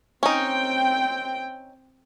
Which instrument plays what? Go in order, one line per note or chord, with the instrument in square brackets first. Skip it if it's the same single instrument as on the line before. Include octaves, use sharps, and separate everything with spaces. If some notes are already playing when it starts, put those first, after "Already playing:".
[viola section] C4 G5 [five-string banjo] C#4 D#4